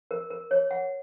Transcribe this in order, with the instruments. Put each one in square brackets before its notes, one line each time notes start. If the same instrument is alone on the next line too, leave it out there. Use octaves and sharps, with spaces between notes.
[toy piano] A#4
A#4
C#5
F#5